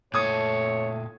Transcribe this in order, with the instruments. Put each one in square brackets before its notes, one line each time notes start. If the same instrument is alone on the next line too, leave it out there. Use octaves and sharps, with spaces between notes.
[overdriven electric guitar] A#2 A4 [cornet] A3 [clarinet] C#5 [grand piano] D#6 G#6